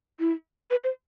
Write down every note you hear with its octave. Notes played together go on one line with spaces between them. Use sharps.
E4
B4
C5